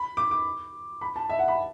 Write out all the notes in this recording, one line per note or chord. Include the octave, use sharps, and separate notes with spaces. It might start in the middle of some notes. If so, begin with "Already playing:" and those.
Already playing: B5
D6
D6
B5
A5
E5
F#5
B5